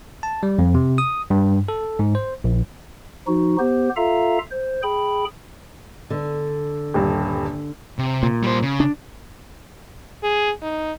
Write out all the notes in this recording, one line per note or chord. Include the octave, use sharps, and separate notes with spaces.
A5
G3
F2
C3
D#6
G2
A4
G#2
C5
A#1
F3 D#4 F#4
B3 G4 C5
F4 A4 E5 F5 A#5
C5
G#4 G5 B5
D3
D#1 G2
C3
A#2
G3 C5
C#3
D4
G#4
D#4